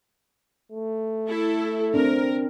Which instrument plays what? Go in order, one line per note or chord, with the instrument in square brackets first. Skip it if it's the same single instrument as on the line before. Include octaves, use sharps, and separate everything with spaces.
[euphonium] A3
[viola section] E4 A4
[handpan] C4 D4 [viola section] A#4